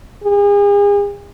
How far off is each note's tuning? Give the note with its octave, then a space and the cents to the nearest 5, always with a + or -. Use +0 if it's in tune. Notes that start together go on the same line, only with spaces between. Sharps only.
G#4 -40